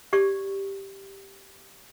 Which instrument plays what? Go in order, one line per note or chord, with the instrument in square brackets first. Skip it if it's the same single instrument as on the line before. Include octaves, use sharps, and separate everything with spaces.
[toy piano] G4 D5 C#6